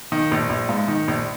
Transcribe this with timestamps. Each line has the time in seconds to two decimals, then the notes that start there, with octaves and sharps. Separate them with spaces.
0.12 D#3
0.31 A#1
0.50 A#1
0.69 G#2
0.88 D#3
1.08 A#1